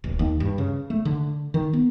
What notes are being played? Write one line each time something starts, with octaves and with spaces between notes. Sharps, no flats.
D1
D#2
G2
C#3
A3
D3
D#3
B3